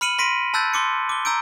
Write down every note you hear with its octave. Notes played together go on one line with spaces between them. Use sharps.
B5 F6 C#7 D#7 F#7
B5 C6 A#6 B6 D7 D#7
A5 B5 E6 F#6 G6 A6
C6 D6 C#7
D6 G7
A#5 E6 G6 D7